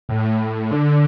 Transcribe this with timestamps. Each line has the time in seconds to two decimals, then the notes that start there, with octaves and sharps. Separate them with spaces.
0.09 A2
0.71 D3